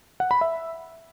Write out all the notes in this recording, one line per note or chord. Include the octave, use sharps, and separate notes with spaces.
F#5
B5
E5